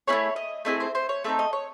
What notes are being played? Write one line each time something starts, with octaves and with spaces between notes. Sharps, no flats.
A3 C4 E4 G#4 C#5
D#5
A3 C4 E4 G#4 D#5
C5
C5
C#5
A3 C4 D#4 E5
D#5
C#5